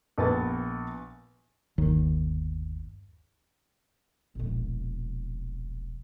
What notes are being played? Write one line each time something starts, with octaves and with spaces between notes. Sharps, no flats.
A#1 B3 A6
G1 D#2 D#3
E1 A#1